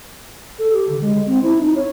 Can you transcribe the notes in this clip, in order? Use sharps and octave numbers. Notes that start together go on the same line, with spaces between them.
A4
G4
D3
G#3
C4
E4
D#4
C#5